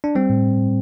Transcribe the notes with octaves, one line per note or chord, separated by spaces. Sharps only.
D4
G3 C4
A2